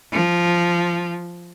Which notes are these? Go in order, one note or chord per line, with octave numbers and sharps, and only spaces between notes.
F3